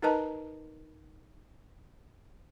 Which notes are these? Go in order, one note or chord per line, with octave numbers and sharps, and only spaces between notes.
D#4 A#4 B4 D#5 A5 A#5